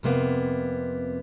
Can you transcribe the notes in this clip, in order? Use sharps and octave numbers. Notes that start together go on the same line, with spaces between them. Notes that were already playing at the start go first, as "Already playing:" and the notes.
F2 C3 A#3 B3